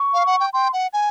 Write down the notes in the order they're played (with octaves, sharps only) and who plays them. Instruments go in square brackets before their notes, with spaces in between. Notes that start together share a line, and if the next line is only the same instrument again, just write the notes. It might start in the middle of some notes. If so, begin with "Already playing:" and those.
Already playing: [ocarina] C#6
[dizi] F5
F#5
G5
[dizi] G5 [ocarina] C6
[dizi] F#5
G#5